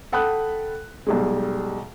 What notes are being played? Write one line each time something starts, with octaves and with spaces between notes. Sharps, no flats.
A4 F#5 G5 B5 D#6 F#6
B1 G3 G#3